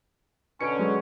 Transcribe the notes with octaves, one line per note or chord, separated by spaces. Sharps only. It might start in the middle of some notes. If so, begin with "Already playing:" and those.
B2 D3 C#4 C#7 D7
F#3 G#3